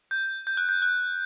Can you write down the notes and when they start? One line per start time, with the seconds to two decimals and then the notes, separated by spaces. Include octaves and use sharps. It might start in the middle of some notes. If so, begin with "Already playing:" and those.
0.11 G6
0.47 G6
0.57 F#6
0.69 G6
0.82 F#6